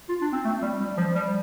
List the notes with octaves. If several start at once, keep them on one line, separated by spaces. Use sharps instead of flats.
F4
D4
C4
A3
G3
G3
F3
G3